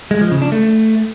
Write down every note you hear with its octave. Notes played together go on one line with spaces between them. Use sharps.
G#3
F3
C#3
D4
A3